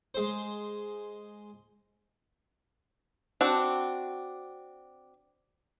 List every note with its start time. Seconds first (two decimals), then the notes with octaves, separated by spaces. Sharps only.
0.14 G#3 C5
3.41 C4 D4 F#4